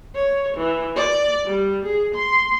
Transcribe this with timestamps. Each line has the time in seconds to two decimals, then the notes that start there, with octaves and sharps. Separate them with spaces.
0.15 C#5
0.57 E3
0.96 D5
1.46 G3
1.86 G#4
2.15 C6